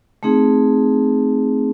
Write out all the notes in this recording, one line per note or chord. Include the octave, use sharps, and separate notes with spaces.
A3 C4 D#4 G#4